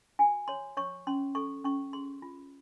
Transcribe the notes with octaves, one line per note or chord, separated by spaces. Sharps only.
F#4 G#5
C#5 C6
C#5 C#6
C#4 C6
A4 C#6
C#4 C#6
G#4 C6
F4